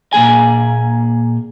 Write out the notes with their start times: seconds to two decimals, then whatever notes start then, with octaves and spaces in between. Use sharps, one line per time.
0.13 A#2 A#3 G#4 G#5